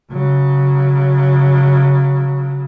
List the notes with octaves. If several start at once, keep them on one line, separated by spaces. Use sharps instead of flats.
C#3 F#3